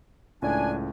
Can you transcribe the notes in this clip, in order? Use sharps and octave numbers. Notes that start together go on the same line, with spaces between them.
C#2 A2 D4 G#5